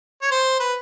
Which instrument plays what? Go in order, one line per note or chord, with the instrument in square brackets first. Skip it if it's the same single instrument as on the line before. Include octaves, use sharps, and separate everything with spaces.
[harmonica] C#5
C5
B4